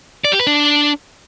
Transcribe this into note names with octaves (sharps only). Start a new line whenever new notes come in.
D5
G4
B4
D4